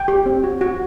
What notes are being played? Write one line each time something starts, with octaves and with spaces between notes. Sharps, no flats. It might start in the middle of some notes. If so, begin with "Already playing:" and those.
Already playing: G5
G4
C4
F#4
F#4